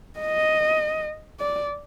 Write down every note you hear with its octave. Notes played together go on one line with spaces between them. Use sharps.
D#5
D5